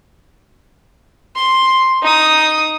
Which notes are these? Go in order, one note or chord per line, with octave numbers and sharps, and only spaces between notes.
C6
D#4 D#6